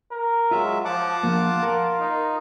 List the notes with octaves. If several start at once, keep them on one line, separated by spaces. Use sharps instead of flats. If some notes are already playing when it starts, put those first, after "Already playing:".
A#4
F#3 G#3 F4 E5
F3 F#5 A5 D6
F3 A#3 F4
A#4
D#4